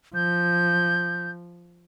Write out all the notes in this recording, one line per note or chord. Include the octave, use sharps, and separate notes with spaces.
F3 G6